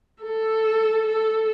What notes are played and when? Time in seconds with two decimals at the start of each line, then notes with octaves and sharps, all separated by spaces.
0.23 A4
1.06 A4